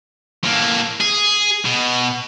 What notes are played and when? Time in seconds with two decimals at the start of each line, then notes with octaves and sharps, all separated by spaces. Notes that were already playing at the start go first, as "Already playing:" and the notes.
0.43 A2 A#3
1.01 G#4
1.65 B2